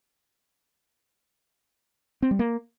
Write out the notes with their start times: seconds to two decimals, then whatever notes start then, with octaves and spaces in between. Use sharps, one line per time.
2.22 C4
2.31 G3
2.39 A#3